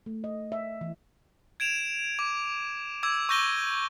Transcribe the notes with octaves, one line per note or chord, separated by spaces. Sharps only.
A3
D#5
E5
E3
G#6 D7 E7 F7
D6
D6 E6 G#6
C#6 E6 G6 A#6 D#7 G7